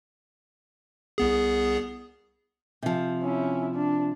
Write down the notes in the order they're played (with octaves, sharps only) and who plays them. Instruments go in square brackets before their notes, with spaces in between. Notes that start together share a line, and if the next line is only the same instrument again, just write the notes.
[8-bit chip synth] C2 B3 G#4
[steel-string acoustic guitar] C3 F3
[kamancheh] C#4 E4
D4